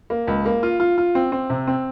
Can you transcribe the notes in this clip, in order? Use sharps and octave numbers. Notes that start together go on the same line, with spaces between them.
A#3
C#2
A#3
F4
F4
F4
C4
C4
C3
C4